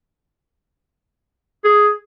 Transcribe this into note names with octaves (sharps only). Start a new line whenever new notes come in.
G#4